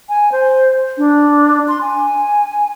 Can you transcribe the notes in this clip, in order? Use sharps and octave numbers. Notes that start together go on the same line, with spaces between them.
G#5
C5
D4
C6
G#5